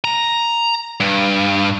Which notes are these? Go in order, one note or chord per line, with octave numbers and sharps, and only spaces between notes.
A#5
G2